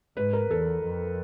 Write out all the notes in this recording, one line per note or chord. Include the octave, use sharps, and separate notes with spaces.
G#2 B4
A#4
E2 A4
F2